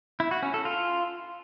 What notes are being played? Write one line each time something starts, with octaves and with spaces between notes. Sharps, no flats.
E4
F#4
C#4
A4
F4